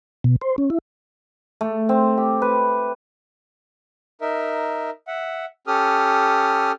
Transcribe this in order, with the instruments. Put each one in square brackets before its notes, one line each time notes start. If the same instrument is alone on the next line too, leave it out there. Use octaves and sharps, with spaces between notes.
[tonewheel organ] B2
C5
C#4
E4
[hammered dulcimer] A3
C4
G4
B4
[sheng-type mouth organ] D#4 A#4 E5
E5 F#5
C#4 G4 A4 D#6 F6